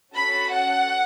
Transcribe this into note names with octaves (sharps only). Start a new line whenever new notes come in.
C#4 F#4 A4 B5
F#5